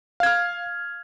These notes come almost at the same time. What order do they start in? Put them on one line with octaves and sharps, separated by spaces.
F5 G#6 F6